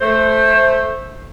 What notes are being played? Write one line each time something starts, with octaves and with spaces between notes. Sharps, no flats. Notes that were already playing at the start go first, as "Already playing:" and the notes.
A3 C5